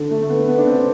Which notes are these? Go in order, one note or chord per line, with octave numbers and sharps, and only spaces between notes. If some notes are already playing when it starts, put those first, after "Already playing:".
Already playing: D3
A3
A3
B3
B3
D4
C4